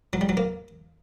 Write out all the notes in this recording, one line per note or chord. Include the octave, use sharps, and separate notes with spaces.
F#3
G3
F#3
A#3